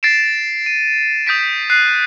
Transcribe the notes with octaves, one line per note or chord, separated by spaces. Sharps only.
A6 A#6 C7 D7 E7
D#7
D#6 G6 A#6 B6 D7
F#6 C7 D#7